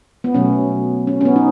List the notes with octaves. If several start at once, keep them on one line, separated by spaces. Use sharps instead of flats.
B3
B2 F#3 A3 C#4
C#4
C#4
B3
D#4